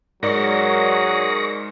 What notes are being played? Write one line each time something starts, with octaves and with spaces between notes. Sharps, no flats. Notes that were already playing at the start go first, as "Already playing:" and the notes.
G#2 F#3 G#4 A#4 D5 C#6 A#6